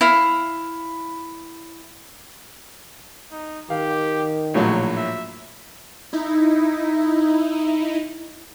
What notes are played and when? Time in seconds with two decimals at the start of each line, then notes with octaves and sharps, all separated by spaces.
0.01 E4 F5
3.32 D#4
3.70 D#3 G4 F5
4.54 A#1 A2 F#3 C#5
4.97 E5
6.13 D#4 E4